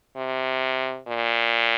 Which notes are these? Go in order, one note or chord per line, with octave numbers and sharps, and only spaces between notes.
C3
A#2